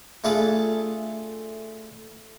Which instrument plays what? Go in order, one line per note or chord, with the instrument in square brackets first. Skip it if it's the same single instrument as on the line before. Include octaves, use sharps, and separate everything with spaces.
[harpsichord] A3 D4 F4 G#4 A4